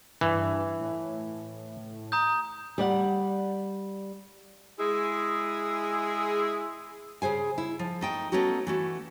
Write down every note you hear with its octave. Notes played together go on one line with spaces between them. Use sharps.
G2 E3
A2
A#5 D#6 G6
G3 D5 F#5
G#3 E4 G#4
C#3 G#4 C5 G#5
E4
F3
A3 D#4 G5
A3 B3 C#4 D#4 F#4
E3 A3 F#4